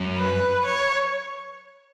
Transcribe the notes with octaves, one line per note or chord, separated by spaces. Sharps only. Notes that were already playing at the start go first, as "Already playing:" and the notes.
Already playing: F#2
B4
C#5